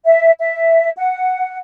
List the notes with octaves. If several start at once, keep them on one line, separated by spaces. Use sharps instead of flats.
E5
E5
F#5